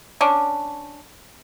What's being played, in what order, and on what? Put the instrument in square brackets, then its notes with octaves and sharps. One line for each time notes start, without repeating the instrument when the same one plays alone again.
[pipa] C#4 D4